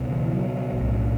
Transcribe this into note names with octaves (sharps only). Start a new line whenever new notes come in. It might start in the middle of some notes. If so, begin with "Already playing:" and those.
Already playing: C#2 B2
E3
F#3
B1 A2